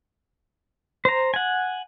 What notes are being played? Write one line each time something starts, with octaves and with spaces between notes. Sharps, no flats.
C5 A#5
F#5 G#5